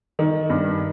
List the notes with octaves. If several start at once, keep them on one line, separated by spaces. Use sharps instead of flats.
D#3
G2